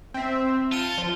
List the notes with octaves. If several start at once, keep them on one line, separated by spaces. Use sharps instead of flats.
C4 E5
F4 A5 C#7 D#7
F3